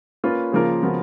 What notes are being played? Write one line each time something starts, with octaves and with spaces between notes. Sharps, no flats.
A#3 C#4 F4 B4
C#3 F3 A#3 F4 A#4
C#3 F3 B3 F#4 A#4